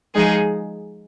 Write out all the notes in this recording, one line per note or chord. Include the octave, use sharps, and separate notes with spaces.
F3 G#3 D#4 G#4